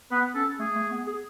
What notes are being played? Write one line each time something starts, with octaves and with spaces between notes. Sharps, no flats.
B3 B4
C#4 A4
A3 G#4
A3
B3
G#4